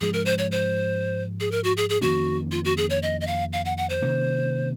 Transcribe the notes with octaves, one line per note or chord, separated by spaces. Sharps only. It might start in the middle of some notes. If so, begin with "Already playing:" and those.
G#2 F3 G#3 G#4
A#4
C5
C#5
C5
G#4
A#4
F#4
G#4
G#4
F2 D#3 A#3 C#4 F#4
F4
F#4
G#4
C#5
D#5
D#5
F5
F5
F#5
F#5
C5
C3 D#3 A#3 C#4